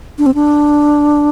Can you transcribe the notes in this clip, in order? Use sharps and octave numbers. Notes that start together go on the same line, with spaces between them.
D4
C4
D4